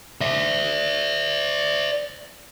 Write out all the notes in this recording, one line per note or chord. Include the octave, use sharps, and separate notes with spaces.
D5 E5